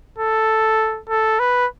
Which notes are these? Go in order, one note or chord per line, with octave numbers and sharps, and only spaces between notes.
A4
A4
B4